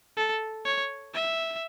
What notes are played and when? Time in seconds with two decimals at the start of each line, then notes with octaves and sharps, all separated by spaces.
0.17 A4
0.65 C#5
1.14 E5